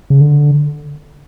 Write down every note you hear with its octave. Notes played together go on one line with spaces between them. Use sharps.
C#3
D3